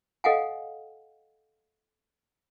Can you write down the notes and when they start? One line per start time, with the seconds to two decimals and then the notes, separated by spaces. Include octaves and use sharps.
0.24 A4 D#5 F5 F#5 G#5